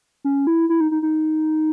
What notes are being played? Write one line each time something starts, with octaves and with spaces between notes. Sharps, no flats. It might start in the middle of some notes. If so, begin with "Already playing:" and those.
C#4
E4
E4
D#4
D#4
D#4